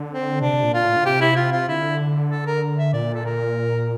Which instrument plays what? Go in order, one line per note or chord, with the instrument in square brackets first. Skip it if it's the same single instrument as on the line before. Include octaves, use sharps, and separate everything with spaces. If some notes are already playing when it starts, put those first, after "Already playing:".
Already playing: [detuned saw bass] D3
[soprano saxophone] C4
[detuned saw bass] C3 [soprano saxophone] D4
[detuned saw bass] C3
A#2
[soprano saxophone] F4
[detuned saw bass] A2
D3
[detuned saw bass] C3 [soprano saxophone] G4
[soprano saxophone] E4
F4
F4
[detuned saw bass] D3 [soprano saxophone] E4
[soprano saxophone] A4
A#4
E5
[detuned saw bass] A#2 [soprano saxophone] D5
[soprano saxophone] A4
A#4